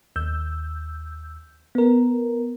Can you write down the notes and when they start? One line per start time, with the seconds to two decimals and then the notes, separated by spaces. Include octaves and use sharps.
0.16 D#2 E6 G6
1.75 B3 A#4